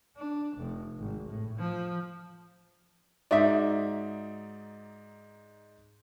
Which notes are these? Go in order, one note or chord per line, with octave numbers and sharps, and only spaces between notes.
D4
F1
G#1
A2
F3
G#2 D#4 F#4 D5 E5